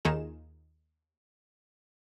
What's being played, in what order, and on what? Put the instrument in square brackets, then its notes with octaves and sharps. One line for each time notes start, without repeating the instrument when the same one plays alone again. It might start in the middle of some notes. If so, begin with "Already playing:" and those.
[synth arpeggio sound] D#2 D#3 D#4 F4 G#4 E7